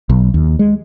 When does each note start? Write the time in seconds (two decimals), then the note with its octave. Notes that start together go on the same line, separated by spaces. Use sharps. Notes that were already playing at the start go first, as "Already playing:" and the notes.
0.09 B1
0.34 D#2
0.59 G#3